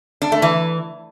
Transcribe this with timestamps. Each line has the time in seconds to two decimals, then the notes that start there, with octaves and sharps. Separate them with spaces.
0.22 D4
0.32 A3
0.42 E3